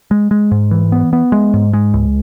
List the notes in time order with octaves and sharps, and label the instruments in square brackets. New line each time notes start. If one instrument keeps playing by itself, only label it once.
[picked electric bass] G#3
G#3
G#2
E3
B3
B3
G#3
G#2
G#3
C#2